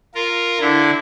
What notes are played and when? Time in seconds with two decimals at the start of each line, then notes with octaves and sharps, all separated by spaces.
0.15 F4 A#4
0.60 D3 E4